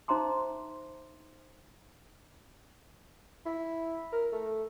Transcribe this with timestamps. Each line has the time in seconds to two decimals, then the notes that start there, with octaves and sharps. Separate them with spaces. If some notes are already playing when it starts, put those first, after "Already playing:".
0.08 D#4 C5 E5 A#5 C6 D6
3.46 E4
4.12 A#4
4.32 A3